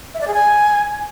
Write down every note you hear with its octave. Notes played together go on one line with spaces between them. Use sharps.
E5
D5
G#4
G#5